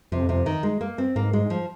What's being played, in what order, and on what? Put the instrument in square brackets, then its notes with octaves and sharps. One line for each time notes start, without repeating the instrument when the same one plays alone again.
[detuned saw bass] F2 [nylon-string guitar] C3
[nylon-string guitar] C3
D#3
G#3
A#3
C4
[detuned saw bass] G#2 [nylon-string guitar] A#3
[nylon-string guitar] G#3
F3